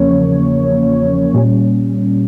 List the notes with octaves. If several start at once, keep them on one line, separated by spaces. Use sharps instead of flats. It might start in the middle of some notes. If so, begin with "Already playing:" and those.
Already playing: E2 C#3 F3 A#3 C#4 C#5
A#2 G3 C#4